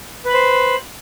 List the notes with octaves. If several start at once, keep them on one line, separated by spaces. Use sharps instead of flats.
B4 C5 B5